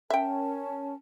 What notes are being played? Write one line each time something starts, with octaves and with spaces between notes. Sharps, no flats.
C#4 A#4 E5 G5 A5